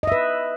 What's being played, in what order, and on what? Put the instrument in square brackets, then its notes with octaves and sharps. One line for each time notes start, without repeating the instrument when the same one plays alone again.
[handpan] D#5
E5
B4